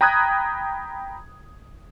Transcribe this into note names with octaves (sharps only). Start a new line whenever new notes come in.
G5 A#5 B5 D#6 F#6 G#6